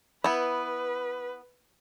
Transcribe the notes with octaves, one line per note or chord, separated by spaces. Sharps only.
B3 E4 B4